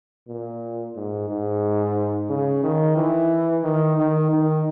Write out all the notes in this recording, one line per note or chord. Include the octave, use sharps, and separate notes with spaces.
A#2
G#2
G#2
C#3
D#3
E3
D#3
D#3
D#3